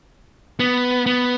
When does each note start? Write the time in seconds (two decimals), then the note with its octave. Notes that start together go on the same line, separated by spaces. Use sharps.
0.60 B3
1.06 B3